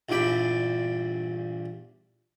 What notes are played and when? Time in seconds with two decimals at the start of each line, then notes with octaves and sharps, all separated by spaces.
0.09 A#1 E2 G2 D5 G5 B5